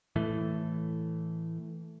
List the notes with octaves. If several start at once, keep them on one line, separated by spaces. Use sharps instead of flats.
A2 E3 A3